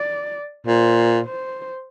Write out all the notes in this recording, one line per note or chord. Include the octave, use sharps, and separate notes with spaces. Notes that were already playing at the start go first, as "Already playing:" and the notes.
Already playing: D5
A#2 C5
C5